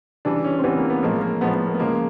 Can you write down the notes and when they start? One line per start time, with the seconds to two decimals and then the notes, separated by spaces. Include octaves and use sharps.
0.25 C#3 E3 G3 D4
0.44 C#4
0.59 C4
0.63 C#3 E3 G3 B3
0.77 A#3
0.90 B3
1.03 A2 F3 G#3 A#3
1.21 A#3
1.41 A2 F3 G#3 B3
1.54 B3
1.67 A#3
1.74 B3
1.80 C#3 F3 G#3 A#3